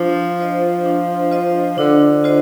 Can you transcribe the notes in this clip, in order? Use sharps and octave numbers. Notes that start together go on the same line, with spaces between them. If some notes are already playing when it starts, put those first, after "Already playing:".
Already playing: F3 D4
F4 C5 D#5
D4
F4 C5 D#5
D3 D4
F4 C5 D#5